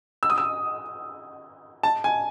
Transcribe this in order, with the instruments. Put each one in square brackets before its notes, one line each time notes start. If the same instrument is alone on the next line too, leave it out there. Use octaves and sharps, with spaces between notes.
[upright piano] E6
D#6
E6
A5
G#5